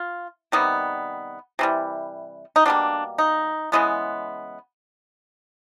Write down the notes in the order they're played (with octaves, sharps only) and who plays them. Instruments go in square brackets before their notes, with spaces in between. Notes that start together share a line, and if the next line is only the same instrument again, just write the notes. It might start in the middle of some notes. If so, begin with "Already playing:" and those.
Already playing: [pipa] F4
C3 D#3 G3 B3
C3 E3 G3
D#4
B2 G3 A#3 D4
D#4
C#3 E3 G#3 B3